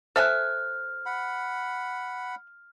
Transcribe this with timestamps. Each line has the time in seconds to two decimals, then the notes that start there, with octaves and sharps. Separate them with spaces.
0.16 A4 C5 E5 G#5 F6 F#6
1.06 F#5 B5